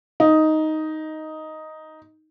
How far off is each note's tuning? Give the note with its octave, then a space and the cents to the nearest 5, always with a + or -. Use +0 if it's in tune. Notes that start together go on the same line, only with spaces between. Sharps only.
D#4 +5